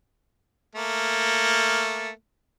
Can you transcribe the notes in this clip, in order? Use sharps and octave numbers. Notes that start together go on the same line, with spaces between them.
A3 A#3